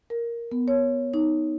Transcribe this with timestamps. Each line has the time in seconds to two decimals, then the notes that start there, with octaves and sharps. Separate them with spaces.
0.10 A#4
0.52 B3
0.68 C#5
1.14 D#4